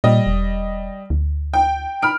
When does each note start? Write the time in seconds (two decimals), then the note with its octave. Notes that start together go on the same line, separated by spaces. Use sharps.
0.04 A#2 G3 D#5
0.27 E1
1.10 D2
1.54 G5
2.02 B5 F6 D7